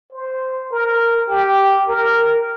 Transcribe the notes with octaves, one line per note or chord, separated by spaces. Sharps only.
C5
A#4
G4
A#4